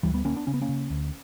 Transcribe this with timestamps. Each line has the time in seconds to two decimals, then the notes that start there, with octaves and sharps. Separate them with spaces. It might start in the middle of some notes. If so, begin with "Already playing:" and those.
0.03 D2 E3 G3
0.14 G3 B3
0.25 D2 A#3 C#4
0.36 B3 D4
0.47 C#3 C#4
0.54 B3
0.61 A#3 C#4
0.69 C#3
0.90 D2